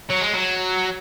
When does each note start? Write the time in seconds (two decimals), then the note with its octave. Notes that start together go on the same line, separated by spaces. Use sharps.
0.10 F#3
0.21 G#3
0.33 F#3